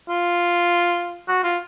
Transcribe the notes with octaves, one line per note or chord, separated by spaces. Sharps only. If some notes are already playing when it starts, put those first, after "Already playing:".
F4
F#4
F4